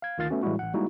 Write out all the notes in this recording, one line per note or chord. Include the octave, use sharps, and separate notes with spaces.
F5 G#6
D2 D#3 F4 F5 A6
A3 B3 C#4 F#4
A2 E3 G3 G#3 E4 F#4
A1 F#5
G3 G#3 A#3 D#4 E4 F#4